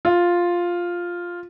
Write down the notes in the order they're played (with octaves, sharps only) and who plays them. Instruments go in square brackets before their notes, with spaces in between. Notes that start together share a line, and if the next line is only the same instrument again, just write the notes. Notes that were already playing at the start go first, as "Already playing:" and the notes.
[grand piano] F4